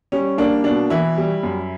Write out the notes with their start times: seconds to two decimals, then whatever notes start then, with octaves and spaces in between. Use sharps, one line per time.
0.12 G3 C#4
0.38 A#3 D4
0.64 B2 D4
0.90 E3 E4
1.17 G3
1.43 F#2